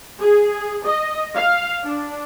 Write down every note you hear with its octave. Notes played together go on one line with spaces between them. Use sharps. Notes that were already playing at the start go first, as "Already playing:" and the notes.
G#4
D#5
F5
D4